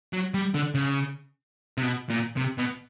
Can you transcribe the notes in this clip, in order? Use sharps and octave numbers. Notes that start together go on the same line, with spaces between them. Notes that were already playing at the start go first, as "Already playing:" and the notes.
F#3
G3
D3
C#3
C3
B2
A#2
C3
B2